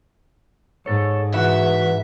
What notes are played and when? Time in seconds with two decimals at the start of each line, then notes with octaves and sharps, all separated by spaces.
0.86 G#2 A4 C#5
1.34 E3 F#4 B4 E5 F#5